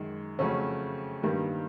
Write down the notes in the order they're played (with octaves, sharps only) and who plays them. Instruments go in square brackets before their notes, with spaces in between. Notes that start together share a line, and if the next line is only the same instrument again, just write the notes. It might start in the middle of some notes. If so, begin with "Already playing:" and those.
Already playing: [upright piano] F#2 D#3 G#3
F2 C#3 F#3 A3 C#4
G2 D#3 G3 A#3